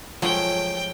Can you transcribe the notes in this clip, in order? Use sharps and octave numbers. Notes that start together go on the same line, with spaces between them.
F3 F#3 G#3 A3 G5